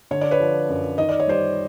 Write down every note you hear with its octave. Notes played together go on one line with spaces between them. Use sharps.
D3 C#5
D5
B4 C#5
F3
F#2
D#3 D#5
D5
C#5
G3 C5 D5